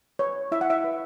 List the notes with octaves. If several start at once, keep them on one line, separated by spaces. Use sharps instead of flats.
B4 C#5
E4 E5
F#5
E5
B4